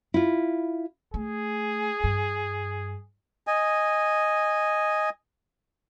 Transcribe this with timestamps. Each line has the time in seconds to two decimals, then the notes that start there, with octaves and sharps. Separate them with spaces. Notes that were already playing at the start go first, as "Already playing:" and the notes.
0.14 E4 F4
1.14 A3 G#4
2.04 G2
3.47 D#5 G#5